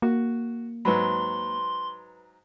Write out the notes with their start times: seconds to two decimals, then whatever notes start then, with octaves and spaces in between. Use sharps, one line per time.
0.02 A#3 F#4
0.85 G#2 F#3 B4 B5 C6